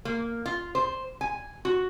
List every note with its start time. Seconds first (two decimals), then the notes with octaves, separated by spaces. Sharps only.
0.05 A#3
0.46 F4
0.75 C5
1.21 G#5
1.65 F#4